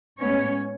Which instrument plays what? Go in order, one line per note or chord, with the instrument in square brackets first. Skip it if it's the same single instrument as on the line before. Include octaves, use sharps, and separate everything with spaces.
[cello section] A2 G#3 B3 C#4 C#5